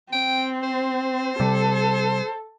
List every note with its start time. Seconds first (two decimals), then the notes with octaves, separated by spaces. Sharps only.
0.13 C4 G5
0.63 C5
1.40 C3 G3 A4